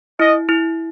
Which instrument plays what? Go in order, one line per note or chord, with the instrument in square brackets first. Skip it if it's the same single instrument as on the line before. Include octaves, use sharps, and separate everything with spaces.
[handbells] E4 [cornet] D#5
[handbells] E4